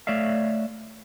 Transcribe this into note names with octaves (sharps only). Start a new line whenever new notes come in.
A3 C#5 D5 E5 F5